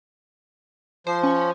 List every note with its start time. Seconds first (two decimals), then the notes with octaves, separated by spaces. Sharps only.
1.07 F3 C5
1.23 C#4